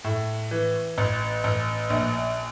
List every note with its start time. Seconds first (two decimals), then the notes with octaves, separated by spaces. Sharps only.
0.04 A2
0.51 E3
0.98 A1
1.44 A1
1.90 A#1